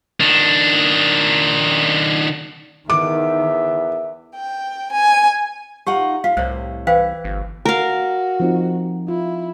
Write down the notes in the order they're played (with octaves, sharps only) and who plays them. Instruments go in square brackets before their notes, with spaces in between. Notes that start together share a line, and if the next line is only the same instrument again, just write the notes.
[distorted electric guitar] D#3 D4
[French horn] E2 [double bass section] D#3 [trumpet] E5 [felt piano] D6
[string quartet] G5
G#5
[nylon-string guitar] D#4 F4 F#5 [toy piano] G4
[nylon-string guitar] F4 [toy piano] F5
[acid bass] C2 [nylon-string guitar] A2 [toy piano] C5 C#5
[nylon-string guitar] E3 [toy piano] C5 F5 G5
[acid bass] G1
[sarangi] F#4 [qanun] A#4 F5
[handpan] F3 C4 D#4
[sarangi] E4 [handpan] F4